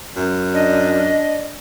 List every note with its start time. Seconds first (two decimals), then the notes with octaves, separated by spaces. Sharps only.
0.16 F#2
0.54 D4 D#5